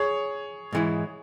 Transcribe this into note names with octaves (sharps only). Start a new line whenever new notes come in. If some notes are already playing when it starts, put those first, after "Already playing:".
Already playing: G#4 C#5
G#2 E3 G#3 E4